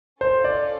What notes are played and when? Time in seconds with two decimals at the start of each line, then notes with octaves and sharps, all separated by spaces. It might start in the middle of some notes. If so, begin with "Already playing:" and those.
0.21 C#4 F4 A4 C5
0.44 D5